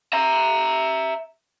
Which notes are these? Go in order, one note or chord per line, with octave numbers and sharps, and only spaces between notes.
E5 A#5